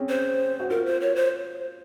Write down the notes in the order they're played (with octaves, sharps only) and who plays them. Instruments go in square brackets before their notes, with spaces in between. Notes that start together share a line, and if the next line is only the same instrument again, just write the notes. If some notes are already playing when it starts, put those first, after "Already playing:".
Already playing: [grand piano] C4 C#4 G#4
[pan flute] C5
[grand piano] F#4
[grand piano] F4 [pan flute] A#4
[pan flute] C5
C#5
C5